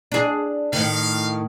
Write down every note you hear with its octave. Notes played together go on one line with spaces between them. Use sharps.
D4 G#4
A2 D#3 F5